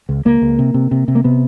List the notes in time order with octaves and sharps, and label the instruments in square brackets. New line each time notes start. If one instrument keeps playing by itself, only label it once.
[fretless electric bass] C#2
C#2 A#3
C#2
C3
C3
C3
C3
A#3
C3 B3